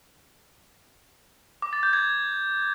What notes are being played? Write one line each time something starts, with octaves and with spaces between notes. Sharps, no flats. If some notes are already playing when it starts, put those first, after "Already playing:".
D6
A6
G6
G#6